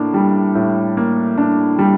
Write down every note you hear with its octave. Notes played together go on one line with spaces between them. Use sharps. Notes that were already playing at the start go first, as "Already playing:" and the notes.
Already playing: A2 A#3 D4
G3
A2
A#3
D4
G3